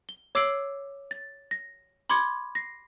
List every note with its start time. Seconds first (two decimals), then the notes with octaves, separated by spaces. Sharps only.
0.09 G7
0.35 C#5 D6 E6 C7 D7 F#7
1.11 A6
1.51 A#6
2.10 B5 C6 D6 G#6 C#7
2.55 A#6 C7